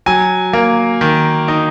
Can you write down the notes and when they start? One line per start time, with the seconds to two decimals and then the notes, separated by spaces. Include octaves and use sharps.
0.06 F#3 G#5
0.53 A#3
1.01 D#3
1.48 D#4